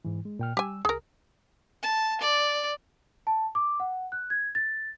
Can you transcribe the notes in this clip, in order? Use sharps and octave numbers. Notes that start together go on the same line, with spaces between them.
G#2 E3
G#3
A#2 G5 F6
G3 G4 G#5 E6
C2 G#4 A#4
A5
D5
A5
D6
F#5
F#6
G#6
A6